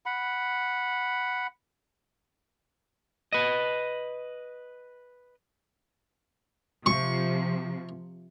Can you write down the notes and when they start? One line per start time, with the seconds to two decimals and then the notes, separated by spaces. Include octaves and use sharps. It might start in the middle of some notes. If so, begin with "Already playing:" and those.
0.06 F#5 B5
3.33 B4 D#5
6.86 C3 F3 C#6